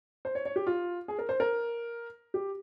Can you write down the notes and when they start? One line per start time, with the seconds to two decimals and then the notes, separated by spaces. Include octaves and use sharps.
0.25 C5
0.35 C#5
0.45 C#5
0.56 G4
0.67 F4
1.08 G#4
1.19 A#4
1.29 C5
1.40 A#4
2.34 G4